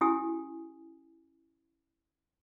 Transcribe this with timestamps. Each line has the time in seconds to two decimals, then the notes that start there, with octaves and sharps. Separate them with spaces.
0.01 C#4 E4 F#4 G4 G#5 D#6